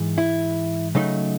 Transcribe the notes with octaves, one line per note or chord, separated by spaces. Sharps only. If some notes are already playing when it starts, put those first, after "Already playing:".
Already playing: G#2 E3 G#3
E4
C#3 F#3 A3 D#4